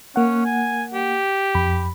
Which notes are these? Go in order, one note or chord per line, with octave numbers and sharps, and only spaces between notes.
A#3 C#4 F#5
G#5
G4
F2 B5